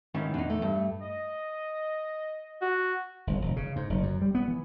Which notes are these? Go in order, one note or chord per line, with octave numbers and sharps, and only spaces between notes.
G#2 D#3 E3 C#4
E2 D4 D#4
A3
G2
D#5
F#4
G1
E1
C#3
G#2
F#1
F#2
G3
B3
E3